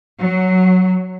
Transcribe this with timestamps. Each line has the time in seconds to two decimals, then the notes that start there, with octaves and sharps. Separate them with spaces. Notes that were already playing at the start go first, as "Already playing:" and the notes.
0.19 F#3